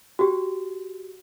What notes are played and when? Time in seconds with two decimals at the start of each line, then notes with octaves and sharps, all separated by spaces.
0.19 F#4 G4